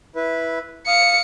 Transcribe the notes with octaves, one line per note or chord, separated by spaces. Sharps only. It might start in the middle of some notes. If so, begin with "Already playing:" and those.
E4 B4
F5 D#6 C#7